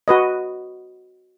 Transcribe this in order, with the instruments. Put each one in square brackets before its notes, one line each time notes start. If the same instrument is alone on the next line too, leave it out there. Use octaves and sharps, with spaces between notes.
[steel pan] F#4 B4 D#5